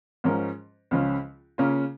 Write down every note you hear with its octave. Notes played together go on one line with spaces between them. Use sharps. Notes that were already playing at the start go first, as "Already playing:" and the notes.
G#2 F3 C#4 A#4
C#2 C#3 F3 C#4 F4
C#3 A#3 C#4 F4